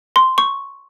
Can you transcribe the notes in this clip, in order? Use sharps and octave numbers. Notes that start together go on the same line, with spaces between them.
C6
C#6